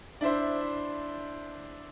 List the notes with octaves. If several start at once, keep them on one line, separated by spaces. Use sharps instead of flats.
D4 E4 C5 E5